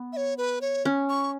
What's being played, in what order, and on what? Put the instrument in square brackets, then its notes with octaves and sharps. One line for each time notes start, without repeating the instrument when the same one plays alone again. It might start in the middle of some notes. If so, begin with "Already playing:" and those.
Already playing: [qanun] B3
[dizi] E5
C#5
B4
C#5
[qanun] C#4
[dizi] C#6